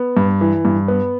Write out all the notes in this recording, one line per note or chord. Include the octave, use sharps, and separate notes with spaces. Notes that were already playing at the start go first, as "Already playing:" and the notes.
Already playing: B3
G2
E3
G2
B3